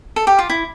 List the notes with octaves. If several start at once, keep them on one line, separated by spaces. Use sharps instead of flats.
A4
G4
F4
E4